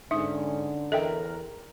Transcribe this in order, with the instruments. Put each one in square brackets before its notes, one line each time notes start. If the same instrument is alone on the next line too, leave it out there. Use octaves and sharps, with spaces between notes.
[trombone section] G#2 C#4 [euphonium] D3 [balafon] D#4 [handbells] E5 D#6
[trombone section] E2 A#4 [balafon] A4 [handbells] D#5 E5 G5